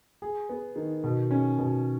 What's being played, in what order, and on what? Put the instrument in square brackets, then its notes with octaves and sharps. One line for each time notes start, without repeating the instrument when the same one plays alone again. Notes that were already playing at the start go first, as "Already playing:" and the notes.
[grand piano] G#4
B3
D#3
B2
C#4
B2